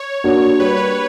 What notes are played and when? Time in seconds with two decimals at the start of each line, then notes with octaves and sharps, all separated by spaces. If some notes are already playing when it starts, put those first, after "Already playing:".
Already playing: C#5
0.24 A#3 D4 F#4
0.59 G3 B4
0.77 B4